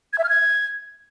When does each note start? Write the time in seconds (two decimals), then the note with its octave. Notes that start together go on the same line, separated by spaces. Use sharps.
0.13 G#6
0.18 E5
0.24 F6
0.29 G#6